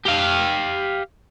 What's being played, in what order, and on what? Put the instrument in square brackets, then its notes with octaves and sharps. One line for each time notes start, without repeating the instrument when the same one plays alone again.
[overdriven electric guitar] G4 F5